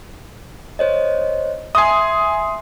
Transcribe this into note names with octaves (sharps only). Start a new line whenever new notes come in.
C5 C#5 D#5
E5 G#5 C6 D#6 C7